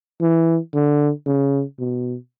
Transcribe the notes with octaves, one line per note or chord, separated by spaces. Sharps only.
E3
D3
C#3
B2